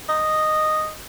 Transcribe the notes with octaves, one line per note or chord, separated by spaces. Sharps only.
D#5